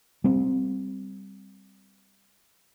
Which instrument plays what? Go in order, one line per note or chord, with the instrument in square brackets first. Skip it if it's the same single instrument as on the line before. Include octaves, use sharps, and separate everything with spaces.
[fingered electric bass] G3 C4